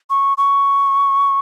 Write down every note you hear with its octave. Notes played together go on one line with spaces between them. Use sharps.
C#6
C#6